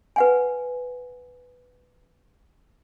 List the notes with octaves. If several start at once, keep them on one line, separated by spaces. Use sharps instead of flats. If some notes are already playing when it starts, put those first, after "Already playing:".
B4 F#5 G#5